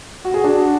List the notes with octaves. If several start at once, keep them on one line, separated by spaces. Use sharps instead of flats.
F#4
G#4
D4 F#4